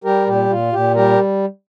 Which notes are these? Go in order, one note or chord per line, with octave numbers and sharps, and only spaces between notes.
G3 G4 A#4
A#2 G4
A#2 F4
A#2 G4
G3 G4 A#4